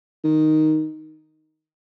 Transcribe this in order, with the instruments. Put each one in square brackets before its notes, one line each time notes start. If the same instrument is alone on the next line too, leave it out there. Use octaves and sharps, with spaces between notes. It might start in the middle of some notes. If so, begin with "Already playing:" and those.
[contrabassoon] D#3